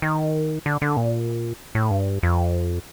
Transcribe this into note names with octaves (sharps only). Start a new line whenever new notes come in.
D#3
D3
D3
A#2
A2
G2
F2